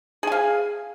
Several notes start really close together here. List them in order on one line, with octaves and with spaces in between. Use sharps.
G#4 G#5 F5